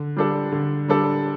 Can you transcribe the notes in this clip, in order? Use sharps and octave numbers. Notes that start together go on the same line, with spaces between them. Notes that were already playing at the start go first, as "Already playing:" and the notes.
Already playing: D3
G3 D4 A4
D3
G3 D4 A4